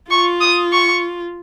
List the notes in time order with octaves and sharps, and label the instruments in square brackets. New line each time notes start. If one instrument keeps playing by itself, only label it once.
[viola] F4 [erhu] C#6
[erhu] D#6
C#6